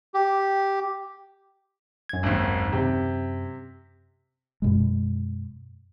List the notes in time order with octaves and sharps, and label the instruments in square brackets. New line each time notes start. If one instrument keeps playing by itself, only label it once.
[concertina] G4
[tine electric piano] F#2 G#6
[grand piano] G#1 D#2
C3
[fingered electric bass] F#2 B2 G#3